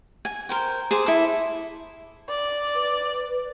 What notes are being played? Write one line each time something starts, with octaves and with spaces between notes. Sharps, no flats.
G#5
A#4 C5 G5
G#4 C5 D6
E4 A4
D5
B4